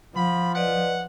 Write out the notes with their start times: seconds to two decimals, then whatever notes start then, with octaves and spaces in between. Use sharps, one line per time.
0.16 F3 F#5 B5
0.55 B4 D5 D#5 F#5